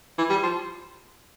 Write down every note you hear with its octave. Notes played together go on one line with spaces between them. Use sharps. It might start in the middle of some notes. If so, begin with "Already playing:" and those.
E3
G3
F3